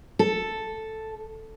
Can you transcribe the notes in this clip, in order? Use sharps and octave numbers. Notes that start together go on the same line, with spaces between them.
A4